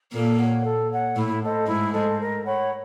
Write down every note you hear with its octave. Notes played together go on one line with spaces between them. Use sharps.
A#2 A#3 A4
C#5 F#5
A4
C#5 F#5
A2 A3 E4
A4 C5 D#5
G#2 G#3 E4
A4 C5 D#5
A#4
C#5 F#5 B5